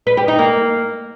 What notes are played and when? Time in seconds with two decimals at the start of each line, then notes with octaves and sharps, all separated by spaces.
0.07 B4
0.17 G4
0.28 D#4
0.39 A#3